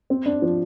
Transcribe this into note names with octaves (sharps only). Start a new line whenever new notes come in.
C4
D4
F3